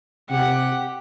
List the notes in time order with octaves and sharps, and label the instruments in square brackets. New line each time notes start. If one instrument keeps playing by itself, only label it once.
[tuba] C3 [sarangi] G4 [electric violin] F#5